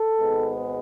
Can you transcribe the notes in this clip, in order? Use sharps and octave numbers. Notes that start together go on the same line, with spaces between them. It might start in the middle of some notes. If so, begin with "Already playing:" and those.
Already playing: A4
G#1 G#2 G#3 B3